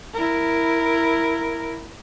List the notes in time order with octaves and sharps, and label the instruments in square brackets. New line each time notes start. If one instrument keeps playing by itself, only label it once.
[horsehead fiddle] E4 A#4